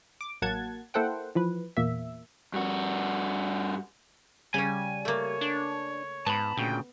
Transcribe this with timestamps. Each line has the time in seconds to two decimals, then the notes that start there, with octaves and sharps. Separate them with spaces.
0.21 D6
0.42 A1 F#3 A#3 F#5 A5 G#6
0.94 A#3 E4 A4 C5 F#5 G5
1.35 E3 F3 B4
1.77 E2 A#2 A#3 E5
2.53 G2 F#4
4.54 C#3 G3 C#4 G#5
5.05 A3 A#3 C#5
5.41 D4
6.26 G#2 B3 A5 B5
6.57 D2 A#2 C#3 G5